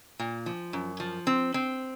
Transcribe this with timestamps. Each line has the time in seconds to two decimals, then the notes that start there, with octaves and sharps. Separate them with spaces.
0.19 A#2
0.46 F3
0.73 F#2
1.00 F3
1.27 C4
1.54 C4